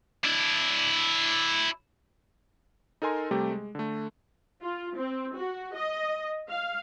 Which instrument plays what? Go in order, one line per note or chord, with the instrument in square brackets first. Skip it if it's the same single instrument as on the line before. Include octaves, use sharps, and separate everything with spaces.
[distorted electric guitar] D4 E4
[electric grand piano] D#4 A4 A#4 G#5 C6
C3 G3 A3 G4
G#3
D3 A3
[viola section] F4
C4
F#4
D#5
F5